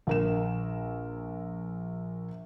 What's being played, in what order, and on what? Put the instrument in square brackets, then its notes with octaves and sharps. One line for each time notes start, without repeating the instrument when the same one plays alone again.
[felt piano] A#1 A#4 E7